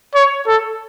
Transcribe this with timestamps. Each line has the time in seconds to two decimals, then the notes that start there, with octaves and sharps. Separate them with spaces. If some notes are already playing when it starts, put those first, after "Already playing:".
0.15 C#5
0.47 A4